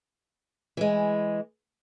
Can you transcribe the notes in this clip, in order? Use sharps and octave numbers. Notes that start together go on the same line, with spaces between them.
E3 G#3